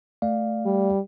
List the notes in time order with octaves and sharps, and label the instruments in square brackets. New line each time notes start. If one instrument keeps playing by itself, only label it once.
[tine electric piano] A3 D5 F5
[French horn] G3